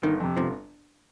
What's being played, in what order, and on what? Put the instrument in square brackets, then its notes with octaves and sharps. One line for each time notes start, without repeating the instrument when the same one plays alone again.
[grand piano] G1 [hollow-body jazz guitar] D#3
[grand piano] F2 C3
[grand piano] G1 [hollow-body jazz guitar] C3 F3